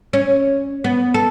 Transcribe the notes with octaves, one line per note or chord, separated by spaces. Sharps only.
C#4
B3
A4